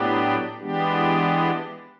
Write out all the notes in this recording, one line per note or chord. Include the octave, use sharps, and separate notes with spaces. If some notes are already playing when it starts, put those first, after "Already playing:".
Already playing: A2 F#3 B3 D4 G4
E3 G#3 B3 D4 G4